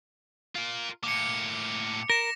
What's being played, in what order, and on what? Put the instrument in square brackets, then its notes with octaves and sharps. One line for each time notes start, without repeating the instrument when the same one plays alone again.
[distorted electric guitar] F4 A#4
[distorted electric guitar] A2 A#3 [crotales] D6 C#7
[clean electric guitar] A#4 [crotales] A#6 E7